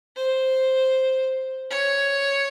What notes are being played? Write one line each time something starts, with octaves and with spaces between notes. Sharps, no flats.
C5
C#5